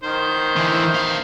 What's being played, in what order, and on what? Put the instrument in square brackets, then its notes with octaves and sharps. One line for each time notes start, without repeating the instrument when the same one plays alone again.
[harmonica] D#3 C5
[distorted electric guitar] D3 E3
B3 F5